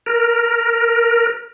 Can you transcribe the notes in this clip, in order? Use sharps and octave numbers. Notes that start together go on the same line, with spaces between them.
A#4